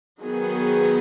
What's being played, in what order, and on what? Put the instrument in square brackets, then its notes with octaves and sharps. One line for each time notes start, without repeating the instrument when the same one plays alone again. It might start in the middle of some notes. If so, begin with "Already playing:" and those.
[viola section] D#3 F#3 B3 G#4